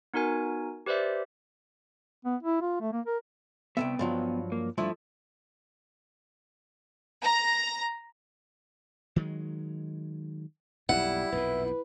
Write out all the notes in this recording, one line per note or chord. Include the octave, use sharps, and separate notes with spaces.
B3 D#4 F#4 A#4 G#5
G4 B4 C5 D5 E5
B3
E4
F4
A3
A#3
A#4
C2 D#3 B3 E5 G5
G2 F3 F#3
A#3
G2 F3 A3 E4
A#5
D#3 F#3 G#3
B1 F2 G3 E4 F#5
B1 F2 A#2 B4